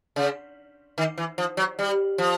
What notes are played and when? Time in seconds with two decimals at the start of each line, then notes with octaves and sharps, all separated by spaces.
0.16 C#3
0.98 D#3
1.18 E3
1.38 F3
1.57 F#3
1.79 G3
2.18 F3